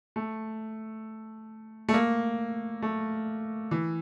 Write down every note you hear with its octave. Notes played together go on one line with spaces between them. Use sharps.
A3
A3
A#3
A3
E3